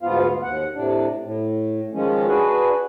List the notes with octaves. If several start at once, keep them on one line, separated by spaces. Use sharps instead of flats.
D2 G#2 F3 B3 F4 F5
D#2 F#5
A2 C3 D4
A2
D#3 F3 G#3 C#4
D4 F#4 G#4 B4